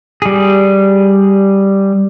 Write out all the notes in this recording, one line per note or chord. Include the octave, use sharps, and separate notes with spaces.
G3 G#4